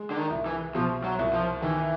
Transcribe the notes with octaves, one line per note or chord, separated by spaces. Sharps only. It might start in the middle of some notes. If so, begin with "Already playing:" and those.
Already playing: G#3
D3
D#3
C2
E3
B2 F3
F#3
C2
F3
D#3 E3